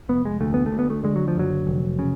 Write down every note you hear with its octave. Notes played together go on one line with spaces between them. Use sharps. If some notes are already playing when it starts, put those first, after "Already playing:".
F1 B3
G#3
D2 A3
B3
A3
D2
B3
A3
D3 G#3
F#3
F3
F#1 F#3
F1
C#3